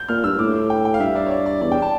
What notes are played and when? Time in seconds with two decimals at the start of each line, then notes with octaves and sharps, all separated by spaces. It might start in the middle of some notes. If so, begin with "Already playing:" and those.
Already playing: G6
0.08 A#2 F6
0.24 G2 E6
0.39 A2 D6
0.70 G5
0.85 G5
0.94 F5
1.00 G2 E5
1.15 D5
1.26 C#5
1.31 D5
1.46 D5
1.61 E2 D5
1.72 G5
1.82 A5